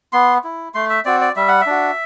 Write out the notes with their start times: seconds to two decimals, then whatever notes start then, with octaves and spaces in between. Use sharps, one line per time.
0.13 B3 C6
0.44 E4
0.74 A3 C6
0.90 E5
1.05 C4 F#4 D5
1.21 D5
1.36 G3 E5
1.48 F#5
1.61 E5
1.67 D4 F#4